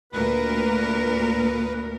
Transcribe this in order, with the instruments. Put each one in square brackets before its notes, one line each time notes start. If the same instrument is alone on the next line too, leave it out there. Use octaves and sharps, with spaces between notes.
[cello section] D2 A#2 A#4 [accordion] B4